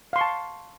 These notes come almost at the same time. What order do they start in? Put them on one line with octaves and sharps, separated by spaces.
F5 C6 C#6 A5